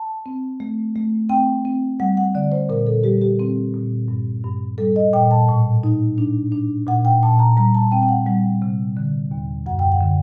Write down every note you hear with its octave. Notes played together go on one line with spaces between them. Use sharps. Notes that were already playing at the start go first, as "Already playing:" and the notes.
Already playing: A5
C4
A3
A3
C4 G5
C4
G3 F#5
F#5
D3 D5
C5
A#2 A#4
A4
G3 G4
G4
C4
A#2
G2
G2
G3 A4
D#5
A#2 G5
A5
A2
D#4
D4
D4
A#2 F#5
G5
A#2 A5
A#5
G3 A#5
A5
C4 G5
G5
F#5
G3 F#5
C3
D3
D#2
F#2 F#5
G5
F#5
D3